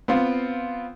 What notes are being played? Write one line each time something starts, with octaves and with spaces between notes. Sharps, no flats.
B3 C4 F4